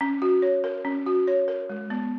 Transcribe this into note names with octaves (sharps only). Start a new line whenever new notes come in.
C#4
F#4
C#5
A#4
C#4
F#4
C#5
A#4
G#3
B3